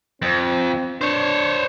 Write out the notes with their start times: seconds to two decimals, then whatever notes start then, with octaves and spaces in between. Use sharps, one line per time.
0.22 F2 C4
1.01 D4 C5 C#5